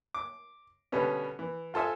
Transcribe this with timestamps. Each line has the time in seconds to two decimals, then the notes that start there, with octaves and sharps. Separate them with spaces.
0.14 D6
0.92 B2 D3 G3 B3 C#4
1.39 E3
1.74 F4 A4 C5 E5 G#5